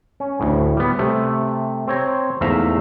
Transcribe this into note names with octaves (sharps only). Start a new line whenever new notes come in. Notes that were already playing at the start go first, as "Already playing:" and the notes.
C#4
D2 A2
G3 B3
C3 A3
C4 C#5 A#5
E2 G#2 A3 E5 F5 A#5